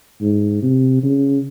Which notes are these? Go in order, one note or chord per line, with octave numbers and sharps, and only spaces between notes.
G#2
C3
C#3